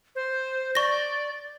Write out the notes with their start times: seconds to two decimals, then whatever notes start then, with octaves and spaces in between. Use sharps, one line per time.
0.15 C5
0.75 D5 C#6 A#6